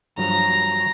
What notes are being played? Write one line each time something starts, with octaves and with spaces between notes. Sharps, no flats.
G2 F3 F#3 A#5